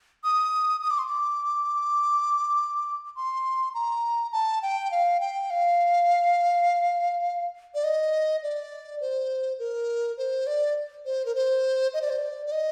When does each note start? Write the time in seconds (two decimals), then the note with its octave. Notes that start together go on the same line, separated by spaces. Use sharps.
0.24 D#6
0.83 D#6
0.91 D6
0.99 C6
1.07 D6
3.16 C6
3.74 A#5
4.32 A5
4.62 G5
4.91 F5
5.20 G5
5.50 F5
7.75 D5
7.84 D#5
8.43 D5
9.01 C5
9.59 A#4
10.18 C5
10.47 D5
11.06 C5
11.26 A#4
11.35 C5
11.94 D#5
12.02 D5
12.10 C5
12.19 D5
12.46 D5
12.52 D#5